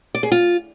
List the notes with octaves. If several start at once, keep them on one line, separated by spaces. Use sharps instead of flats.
D5
G#4
F4